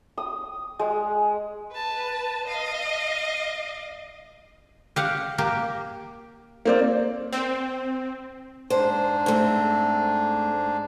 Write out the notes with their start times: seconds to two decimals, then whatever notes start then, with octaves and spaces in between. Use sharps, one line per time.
0.18 D#6
0.79 G#3
1.72 B4 A5
2.47 D#5 F5
4.96 G4 F5 F#5
5.38 A#3 G4
6.65 A#3 C4 D5
7.33 C4
8.70 G#2 D4 C5
9.26 A3 C4